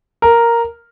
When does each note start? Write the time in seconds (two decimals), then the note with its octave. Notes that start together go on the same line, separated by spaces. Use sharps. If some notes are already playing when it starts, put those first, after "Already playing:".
0.22 A#4